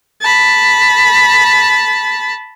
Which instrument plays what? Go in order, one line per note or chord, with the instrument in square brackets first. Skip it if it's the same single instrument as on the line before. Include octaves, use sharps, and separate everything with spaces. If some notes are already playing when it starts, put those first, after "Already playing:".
[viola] A5 B5